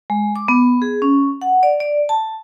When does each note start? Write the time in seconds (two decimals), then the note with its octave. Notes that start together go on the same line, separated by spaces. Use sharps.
0.10 G#3
0.36 D6
0.48 B3
0.82 G#4
1.02 C#4
1.42 F#5
1.63 D5
1.80 D5
2.09 A5